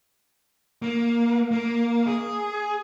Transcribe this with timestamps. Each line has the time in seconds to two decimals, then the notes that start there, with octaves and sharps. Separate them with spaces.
0.82 A#3
1.52 A#3
2.07 G#4